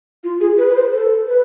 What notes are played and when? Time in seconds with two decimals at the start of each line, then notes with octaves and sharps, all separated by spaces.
0.24 F4
0.40 G#4
0.58 B4
0.70 B4
0.75 C5
0.93 A4
1.27 B4